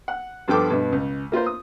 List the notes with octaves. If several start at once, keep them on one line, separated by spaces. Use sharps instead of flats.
F#5
G2 F3 B3 A4 G5 D6
G2 B2 B3
C#2
A#3 F4 B4 C5
D#6